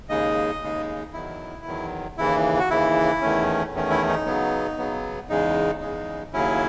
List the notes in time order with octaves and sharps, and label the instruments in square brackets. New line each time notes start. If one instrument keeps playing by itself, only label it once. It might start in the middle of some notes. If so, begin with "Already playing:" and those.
[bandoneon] D#2 C#3 G#3 D#4 D#5
D#2 C#3 G#3 D#4
E2 D#3 F#3 E4
E2 D#3 F#3
D#2 C#3 E3 E4
F#4
D#2 C#3 E3 E4
E2 D#3 A3 C#4
E2 D#3 A3 C#4
E4
D#4
C#3 F#3 B3
C#3 F#3 B3
E2 C#3 G#3 D#4
E2 C#3 G#3 D#4
D#2 C#3 F#3 C#4 E4